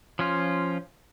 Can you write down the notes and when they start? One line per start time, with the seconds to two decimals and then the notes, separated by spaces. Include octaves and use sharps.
0.19 F3 C#4 F4